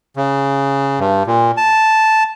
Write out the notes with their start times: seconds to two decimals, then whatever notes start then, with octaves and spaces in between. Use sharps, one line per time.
0.17 C#3
0.99 G2
1.27 A#2
1.57 A5